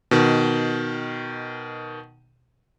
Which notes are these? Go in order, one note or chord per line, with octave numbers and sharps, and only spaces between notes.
B2 D#3